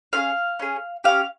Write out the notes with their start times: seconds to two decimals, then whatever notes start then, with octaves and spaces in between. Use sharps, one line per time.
0.13 C#4 F4 F5
0.17 G#4
0.59 C#4 G#4
1.04 C#4 G4 F5